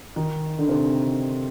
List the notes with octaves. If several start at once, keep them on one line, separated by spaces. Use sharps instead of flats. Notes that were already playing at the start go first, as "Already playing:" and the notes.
D#3 D#4
D3 D4
C3 C4